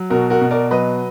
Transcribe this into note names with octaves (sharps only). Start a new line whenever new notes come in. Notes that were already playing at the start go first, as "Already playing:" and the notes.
Already playing: F#3
B2 F#4 A#4
F#4 A#4
B2
A#4 D5
F#3 B4 D#5